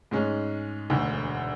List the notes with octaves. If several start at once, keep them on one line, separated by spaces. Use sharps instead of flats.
G#2 G#3 C#4
E1 D2 D3